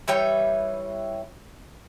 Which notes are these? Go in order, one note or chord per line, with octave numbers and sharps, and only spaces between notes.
E3 G3 C#5 G5